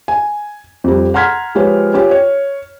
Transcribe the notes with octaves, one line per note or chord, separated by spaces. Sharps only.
G#5
F2 G3
F#5 A#5 C6 F6 G#6 B6
F3 G#3 F4 G4 B4 C#5
C#4 F4 G4
C#5